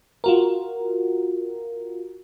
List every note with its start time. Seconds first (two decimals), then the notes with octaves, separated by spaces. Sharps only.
0.24 F4 F#4 A#4